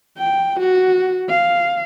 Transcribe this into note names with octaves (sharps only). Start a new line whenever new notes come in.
G5
F#4
F5